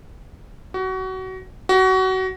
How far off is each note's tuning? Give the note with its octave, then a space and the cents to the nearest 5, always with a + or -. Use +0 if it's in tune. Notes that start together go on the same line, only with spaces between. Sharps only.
F#4 +25
F#4 +25